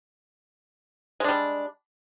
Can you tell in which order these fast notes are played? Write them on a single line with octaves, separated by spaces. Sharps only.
G#3 D4 G3